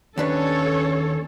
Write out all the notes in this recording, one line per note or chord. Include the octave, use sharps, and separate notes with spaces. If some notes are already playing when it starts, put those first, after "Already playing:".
D#2 C#4 D4 A4 B4 C#5